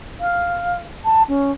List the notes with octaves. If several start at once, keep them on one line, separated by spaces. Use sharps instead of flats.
F5
A5
C#4